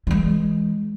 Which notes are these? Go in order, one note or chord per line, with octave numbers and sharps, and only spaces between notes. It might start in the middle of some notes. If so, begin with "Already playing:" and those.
E3 G#3